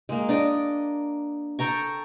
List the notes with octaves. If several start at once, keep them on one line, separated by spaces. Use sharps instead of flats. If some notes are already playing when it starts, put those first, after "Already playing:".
G#3 A#3
D4 D#5 D6
A4 G5 A#5 C#6